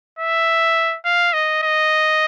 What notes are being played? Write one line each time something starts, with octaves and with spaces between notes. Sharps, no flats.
E5
F5
D#5
D#5